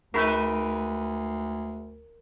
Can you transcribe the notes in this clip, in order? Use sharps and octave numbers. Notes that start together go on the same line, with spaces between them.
D2 G#3 D#4 A#4 B4 B5